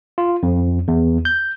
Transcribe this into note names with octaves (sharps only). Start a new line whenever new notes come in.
F4
F2
E2
G6